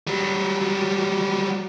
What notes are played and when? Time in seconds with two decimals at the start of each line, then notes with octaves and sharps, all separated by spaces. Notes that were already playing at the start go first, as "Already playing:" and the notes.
0.07 F#3 G3